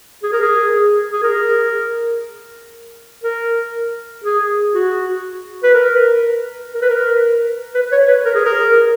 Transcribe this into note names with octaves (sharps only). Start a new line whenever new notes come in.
G#4
A#4
G#4
G#4
A#4
A#4
G#4
F#4
B4
A#4
A#4
B4
A#4
B4
C#5
B4
A#4
G#4
A#4